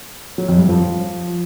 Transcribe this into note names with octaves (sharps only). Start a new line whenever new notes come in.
F#3
F2
G2
F3